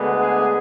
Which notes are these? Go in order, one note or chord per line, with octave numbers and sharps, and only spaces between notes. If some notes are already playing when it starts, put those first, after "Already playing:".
Already playing: D2 D3 G#3 B3
G#4